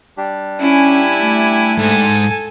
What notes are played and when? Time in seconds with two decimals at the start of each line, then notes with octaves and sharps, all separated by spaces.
0.17 G3 D4 G4
0.60 C#4 E4 G#5
1.18 A3
1.79 G#2 A4 G#5